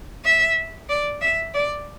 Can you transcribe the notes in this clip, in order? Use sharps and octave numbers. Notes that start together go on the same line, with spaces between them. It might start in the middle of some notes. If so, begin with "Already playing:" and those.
E5
D5
E5
D5